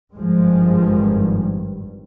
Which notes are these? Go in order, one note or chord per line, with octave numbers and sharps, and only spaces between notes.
G#1 G2 F3 G#3